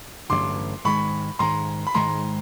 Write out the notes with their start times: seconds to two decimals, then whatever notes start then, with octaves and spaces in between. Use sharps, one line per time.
0.29 A1 G2 D3 F#3 C6 D6
0.84 G#2 D#3 G#3 B5 C#6
1.39 G#2 D#3 G#3 A#5 C6
1.87 B5
1.95 G#2 D#3 G#3 A#5 C6